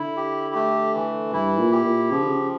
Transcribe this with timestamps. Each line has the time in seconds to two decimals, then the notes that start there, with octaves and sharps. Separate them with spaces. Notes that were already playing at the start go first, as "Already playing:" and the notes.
Already playing: D3 E4
0.16 G4
0.55 A3
0.95 E3
1.33 G2 E4
1.59 A#2
1.72 G4
1.84 A#2
2.10 C#3 F3
2.22 D3
2.29 C#3